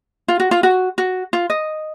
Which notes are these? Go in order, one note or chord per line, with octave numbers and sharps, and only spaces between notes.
F4
F#4
F4
F#4
F#4
F4
D#5